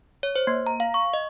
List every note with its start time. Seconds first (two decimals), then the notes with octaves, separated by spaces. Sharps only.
0.23 C#5
0.36 C5
0.47 A#3
0.67 A#5
0.80 F5
0.94 C#6
1.13 D#5